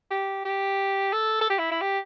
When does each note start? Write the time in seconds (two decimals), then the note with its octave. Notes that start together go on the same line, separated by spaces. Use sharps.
0.11 G4
0.45 G4
1.13 A4
1.41 A4
1.50 G4
1.59 E4
1.72 E4
1.81 G4